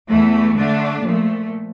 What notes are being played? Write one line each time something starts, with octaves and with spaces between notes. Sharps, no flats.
E2 E3 A3
D3 A3 D4
A#2 F3 A3